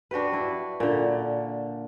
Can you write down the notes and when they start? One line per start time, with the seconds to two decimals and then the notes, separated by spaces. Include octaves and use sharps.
0.11 D4 F#4 G4 B4
0.32 D4 E4
0.80 A#2 D3